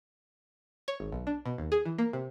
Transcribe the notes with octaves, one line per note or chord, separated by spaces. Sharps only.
C#5
G#1
B1
D4
B2
D#2
G#4
E3
A#3
C3